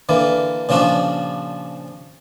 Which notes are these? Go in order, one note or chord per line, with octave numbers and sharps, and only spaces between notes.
D3 E3 A#3
A#2 C#3 F3 D4 F#4